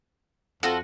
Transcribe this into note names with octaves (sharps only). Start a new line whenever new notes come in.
F2 F4 F#4 A4 F#5